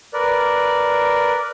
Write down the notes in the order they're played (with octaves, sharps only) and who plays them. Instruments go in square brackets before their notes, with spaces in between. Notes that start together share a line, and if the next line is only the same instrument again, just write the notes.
[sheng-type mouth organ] A#4 B4 D5